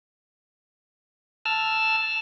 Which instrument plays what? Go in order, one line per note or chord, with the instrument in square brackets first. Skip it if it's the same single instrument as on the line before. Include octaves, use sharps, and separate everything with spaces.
[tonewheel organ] A5 E6 F6